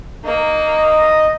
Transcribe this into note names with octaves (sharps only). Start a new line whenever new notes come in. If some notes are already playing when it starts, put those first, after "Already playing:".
A#3 D#4
D#5